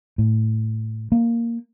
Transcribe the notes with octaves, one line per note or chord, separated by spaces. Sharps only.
A2
A#3